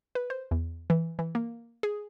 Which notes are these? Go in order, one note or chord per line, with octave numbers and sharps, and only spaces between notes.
B4
C5
E2
E3
E3
A#3
G#4